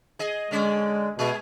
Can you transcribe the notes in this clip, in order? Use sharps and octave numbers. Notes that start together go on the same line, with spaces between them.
G#4 D#5
D3 G#3 C#4 D5
B2 G#3 G#4